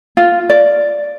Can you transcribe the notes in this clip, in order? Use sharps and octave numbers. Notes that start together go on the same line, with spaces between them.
F4
D5